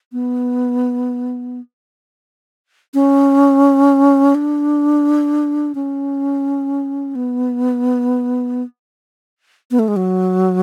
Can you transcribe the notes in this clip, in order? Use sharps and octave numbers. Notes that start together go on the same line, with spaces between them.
B3
C#4
D4
C#4
B3
B3
A3
G#3
F#3